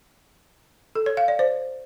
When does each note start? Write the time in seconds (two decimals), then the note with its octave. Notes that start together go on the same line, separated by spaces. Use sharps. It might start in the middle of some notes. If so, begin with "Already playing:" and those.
0.95 A4
1.06 C#5
1.17 F5
1.28 D5
1.39 C5